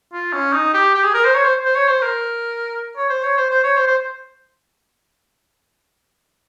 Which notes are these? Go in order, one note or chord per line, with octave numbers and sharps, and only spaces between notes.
F4
C#4
D#4
G4
G4
G#4
A#4
C5
C#5
C5
C5
C#5
C5
A#4
C#5
C5
C#5
C5
C5
C#5
C5
C5